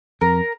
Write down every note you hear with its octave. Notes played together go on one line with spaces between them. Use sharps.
F2 A#4